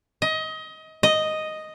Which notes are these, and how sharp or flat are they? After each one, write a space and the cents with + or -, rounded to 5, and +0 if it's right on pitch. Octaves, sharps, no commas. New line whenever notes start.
D#5 +25
D#5 +0